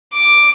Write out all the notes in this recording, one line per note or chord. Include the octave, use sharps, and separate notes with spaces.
D6